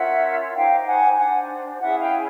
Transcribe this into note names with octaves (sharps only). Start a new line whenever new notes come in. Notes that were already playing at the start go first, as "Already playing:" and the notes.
Already playing: C#4 F4 A#4 C#5 E5 F#5
D#4 G4 C5 F5 G5
F#5 G#5
D4 G4 C5 F#5 G#5
C#4 E4 G#4 E5 F#5
F5 G5